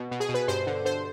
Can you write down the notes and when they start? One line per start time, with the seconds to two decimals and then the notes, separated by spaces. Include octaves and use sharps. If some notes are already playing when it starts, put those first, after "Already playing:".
Already playing: B2
0.11 B2
0.20 G#4
0.29 B2
0.34 B4
0.48 G2 C5
0.67 D3
0.85 D3 C5